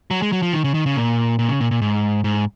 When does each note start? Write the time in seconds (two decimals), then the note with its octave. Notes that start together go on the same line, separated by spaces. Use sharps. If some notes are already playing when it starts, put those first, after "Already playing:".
0.11 F#3
0.22 G#3
0.32 F#3
0.42 F3
0.53 D#3
0.64 C#3
0.74 D#3
0.86 C#3
0.96 A#2
1.39 A#2
1.49 C#3
1.61 A#2
1.71 A#2
1.82 G#2
2.24 G#2